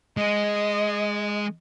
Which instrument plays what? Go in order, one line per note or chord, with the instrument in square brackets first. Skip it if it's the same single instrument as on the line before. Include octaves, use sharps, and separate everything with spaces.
[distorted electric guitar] G#3 G#4 [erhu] D#5